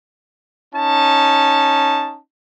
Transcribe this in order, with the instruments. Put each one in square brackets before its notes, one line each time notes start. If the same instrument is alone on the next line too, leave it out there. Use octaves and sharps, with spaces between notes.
[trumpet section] C#4 D#4 A5